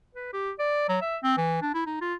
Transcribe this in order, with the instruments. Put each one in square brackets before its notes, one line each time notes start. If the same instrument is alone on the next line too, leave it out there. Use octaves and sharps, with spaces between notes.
[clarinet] B4
G4
D5
F#3
E5
C4
E3
D4
E4
D#4
F4